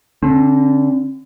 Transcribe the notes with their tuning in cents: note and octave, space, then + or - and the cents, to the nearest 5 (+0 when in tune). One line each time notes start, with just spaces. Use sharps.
D3 -20 C4 +40